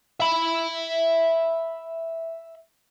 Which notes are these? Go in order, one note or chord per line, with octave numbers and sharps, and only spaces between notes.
E5 B5